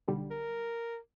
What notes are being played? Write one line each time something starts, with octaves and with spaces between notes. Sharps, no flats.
B1 D3 G3
A#4